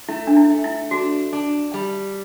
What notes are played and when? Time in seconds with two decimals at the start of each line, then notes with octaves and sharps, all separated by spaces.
0.09 A3 E4
0.27 D4
0.37 E4
0.50 A3
0.64 E4
0.91 D4 F#4
1.33 D4
1.74 G3